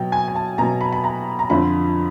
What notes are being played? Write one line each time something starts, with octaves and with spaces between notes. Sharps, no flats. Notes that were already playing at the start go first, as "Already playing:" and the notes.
Already playing: B2 F#3 G5
G#5
G#5
A5
B2 F#3 A#5
B5
B5
A#5
A#5
F2 D3 F3 B5